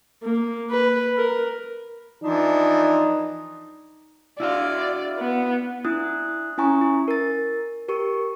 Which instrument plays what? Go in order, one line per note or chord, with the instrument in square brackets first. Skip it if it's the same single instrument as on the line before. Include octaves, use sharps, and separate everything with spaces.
[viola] A#3
B4
A#4
[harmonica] E3 F3 D4 [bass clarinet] D#4
[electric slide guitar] E4 F#4 F5 [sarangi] D5
[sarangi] B3
[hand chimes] D4 E4 D#6 F#6
C#4 E4 G#5 A#5 C#6
E4
A#4 A6
G4 A#4 C#6